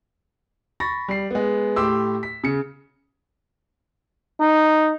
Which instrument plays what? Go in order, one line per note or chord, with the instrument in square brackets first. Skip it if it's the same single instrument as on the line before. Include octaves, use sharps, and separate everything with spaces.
[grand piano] B5 C#6 A6 A#6
G3 C7
G#3 B3
A2 G4 C6 D6 E6
B6
C#3 C#7
[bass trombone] D#4